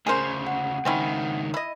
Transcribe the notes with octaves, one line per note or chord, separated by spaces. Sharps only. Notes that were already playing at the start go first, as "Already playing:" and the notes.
D2 C#3 G#4 A#4 C5
F#5
C#2 D#3 C4 C#4 E4
E4 D#5